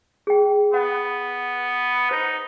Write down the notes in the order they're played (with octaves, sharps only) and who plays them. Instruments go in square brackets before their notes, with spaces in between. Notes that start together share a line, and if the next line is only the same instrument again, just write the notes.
[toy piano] G#4 G5
[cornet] B3 [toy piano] F#5
[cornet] D#4 [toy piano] C5